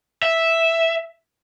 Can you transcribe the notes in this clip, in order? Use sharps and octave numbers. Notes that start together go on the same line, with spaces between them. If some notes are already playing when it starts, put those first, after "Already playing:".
E5